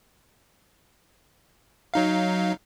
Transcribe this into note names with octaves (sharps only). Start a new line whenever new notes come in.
F#3 D#4 F5